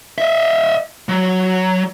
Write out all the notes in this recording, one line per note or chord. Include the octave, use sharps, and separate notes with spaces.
D#5 E5
F#3